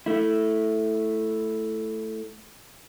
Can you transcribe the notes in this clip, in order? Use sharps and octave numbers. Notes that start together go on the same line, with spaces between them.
A3 E4